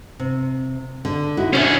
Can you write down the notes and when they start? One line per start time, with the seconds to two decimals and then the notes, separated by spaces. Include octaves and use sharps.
0.20 C3
1.05 D3
1.37 D#4 E4 F#4
1.53 B2 C#4 D4 C#5 E5